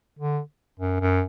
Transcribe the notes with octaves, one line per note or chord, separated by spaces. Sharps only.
D3
F#2
F#2